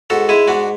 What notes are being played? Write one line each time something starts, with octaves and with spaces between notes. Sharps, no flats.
G#2 F#4 A4
G#3 E4 G#4
G#2 D4 F#4